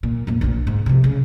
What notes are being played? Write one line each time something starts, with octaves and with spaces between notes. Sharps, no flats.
A#2
F2 A#2
A#1 A#2
G#2
C3 F3
C#3